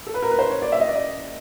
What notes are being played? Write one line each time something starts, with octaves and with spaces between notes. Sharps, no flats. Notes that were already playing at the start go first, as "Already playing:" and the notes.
A4
B4
A#4
B4
C5
C#5
D5
E5
D#5
D5
D#5